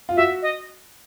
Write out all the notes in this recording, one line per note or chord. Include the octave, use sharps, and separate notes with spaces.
F4
F#4 E5
D#5